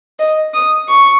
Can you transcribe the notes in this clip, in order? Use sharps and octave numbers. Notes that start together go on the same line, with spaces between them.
D#5
D#6
C#6